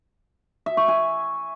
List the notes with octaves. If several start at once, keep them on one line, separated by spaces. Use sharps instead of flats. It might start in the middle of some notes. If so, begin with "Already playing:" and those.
E5
C#6
G#5